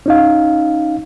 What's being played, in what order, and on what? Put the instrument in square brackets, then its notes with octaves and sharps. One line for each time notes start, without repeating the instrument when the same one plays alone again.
[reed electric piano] C#4 D#4 F5